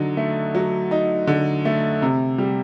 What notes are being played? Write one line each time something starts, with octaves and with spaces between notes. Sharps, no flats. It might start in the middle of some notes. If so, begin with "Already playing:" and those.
Already playing: D3 F#3 D#4
A3
F#3
D#4
D3
A3
C3
G3